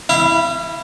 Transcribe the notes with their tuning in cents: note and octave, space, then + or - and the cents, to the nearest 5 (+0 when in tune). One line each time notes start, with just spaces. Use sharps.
E4 -5 F5 -40